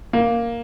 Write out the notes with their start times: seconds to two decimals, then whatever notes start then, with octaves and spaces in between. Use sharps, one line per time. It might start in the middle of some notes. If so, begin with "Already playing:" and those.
0.13 A#3